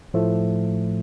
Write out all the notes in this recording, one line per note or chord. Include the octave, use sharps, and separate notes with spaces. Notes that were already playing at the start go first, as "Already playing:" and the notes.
A2 F3 A3